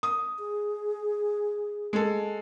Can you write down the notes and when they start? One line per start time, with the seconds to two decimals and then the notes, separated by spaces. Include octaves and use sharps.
0.03 D#6
0.39 G#4
1.93 G#3 A4